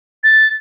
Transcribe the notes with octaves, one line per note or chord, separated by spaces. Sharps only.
A6